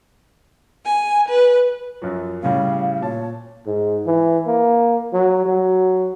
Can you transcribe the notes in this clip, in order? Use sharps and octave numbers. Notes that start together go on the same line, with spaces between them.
G#5
B4
F#2 F3 F#3
A2 C#3 G3 F5
A#2 C#5 A5
G#2
E3
A#3
F#3
F#3